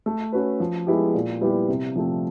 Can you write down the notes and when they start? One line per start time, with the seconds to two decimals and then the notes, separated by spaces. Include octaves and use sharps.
0.06 A3
0.33 C#4 F#4 B4
0.60 F3
0.87 G#3 B3 E4 G4
1.14 A#2
1.41 G3 B3 E4 G4
1.69 C3
1.95 F3 A3 C4